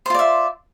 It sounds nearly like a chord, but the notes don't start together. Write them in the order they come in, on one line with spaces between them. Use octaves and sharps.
C5 F4 D5 E5